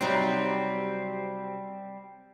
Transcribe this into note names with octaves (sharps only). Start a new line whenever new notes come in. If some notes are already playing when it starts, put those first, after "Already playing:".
C3 F#3 G3 C4 D#4